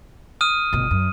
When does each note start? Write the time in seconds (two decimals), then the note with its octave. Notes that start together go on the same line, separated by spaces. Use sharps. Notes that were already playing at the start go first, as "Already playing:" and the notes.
0.41 D#6 F6 D#7
0.73 G1 B2
0.91 F#2